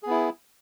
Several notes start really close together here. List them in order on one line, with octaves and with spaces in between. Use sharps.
G#4 B3 E4